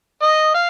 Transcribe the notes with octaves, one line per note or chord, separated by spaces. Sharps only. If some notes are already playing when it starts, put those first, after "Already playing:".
D#5
F5